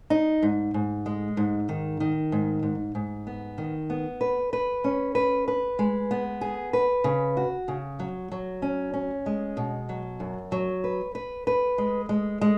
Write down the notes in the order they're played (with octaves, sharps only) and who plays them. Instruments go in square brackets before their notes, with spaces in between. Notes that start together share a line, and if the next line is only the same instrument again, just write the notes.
[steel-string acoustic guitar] D#4
G#2
G#2
G#3
G#2
D#3
D#3
G#2
G#2
G#2
B3
D#3
B3
B4
B4
C#4
B4
B4
G#3
B3
G#4
B4
C#3
F#4
C#3
F#3
F#3
C#4
C#4
G#3
B2
F#3
F#2
F#3
B4
B4
B4
G#3
G#3
G#3